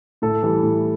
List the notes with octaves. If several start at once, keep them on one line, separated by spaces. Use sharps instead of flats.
A2 A4
E3 G3
A2